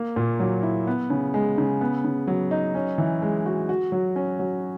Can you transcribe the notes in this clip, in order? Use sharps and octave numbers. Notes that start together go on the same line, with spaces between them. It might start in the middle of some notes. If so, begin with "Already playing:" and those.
Already playing: A#3
A#2
F#3
E4
B3
C#3
G#3
C#3
B3
C#3
F#3
D#4
C#4
E3
G#3
F#4
F#4
F#3
C#4
F#3